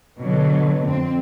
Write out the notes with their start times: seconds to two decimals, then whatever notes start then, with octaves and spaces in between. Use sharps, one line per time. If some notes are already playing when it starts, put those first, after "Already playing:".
0.19 B2 D3 F#3
0.87 F2 C4